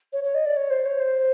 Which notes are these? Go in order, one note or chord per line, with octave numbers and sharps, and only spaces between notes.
C#5
C#5
D#5
D5
C#5
C5
C#5
C5